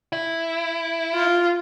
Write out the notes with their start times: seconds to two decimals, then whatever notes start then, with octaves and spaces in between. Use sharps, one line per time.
0.13 E4
1.15 F4